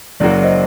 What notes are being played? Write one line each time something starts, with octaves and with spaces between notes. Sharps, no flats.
F#1 F#2 F#3 A#3 F#4 D5
D5
C5 D#5